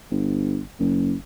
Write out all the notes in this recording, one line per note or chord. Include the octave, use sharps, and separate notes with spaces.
G1
F#1